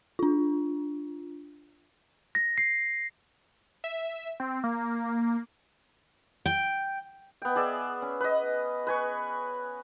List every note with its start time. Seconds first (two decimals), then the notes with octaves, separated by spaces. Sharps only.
0.19 D4 F4
2.35 A#6
2.58 C7
3.84 E5
4.40 C4
4.64 A#3
6.46 G5
7.42 B3 G5
7.56 G#4 D5 E5
8.02 C#4
8.20 B4 D#5
8.87 B4 G#5 C#6